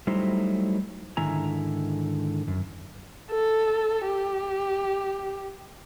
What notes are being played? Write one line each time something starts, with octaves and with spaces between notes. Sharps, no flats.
F#3 G3 A3 D#4 E4 C5
G#2 D3 D#3 E4 G#5 A#5
F#2
A4
G4